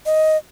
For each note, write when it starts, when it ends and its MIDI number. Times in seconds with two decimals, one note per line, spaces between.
0.06 0.37 75